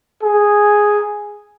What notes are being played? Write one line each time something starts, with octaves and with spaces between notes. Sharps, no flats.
G#4